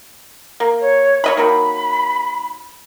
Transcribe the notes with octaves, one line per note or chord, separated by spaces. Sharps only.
A#3
C#5
C#5 D#5 B5
D#3 F#3 A#3 B5